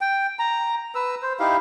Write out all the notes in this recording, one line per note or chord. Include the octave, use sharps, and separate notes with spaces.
G5
A#5
B4 E6
C5
D#4 E4 G4 F5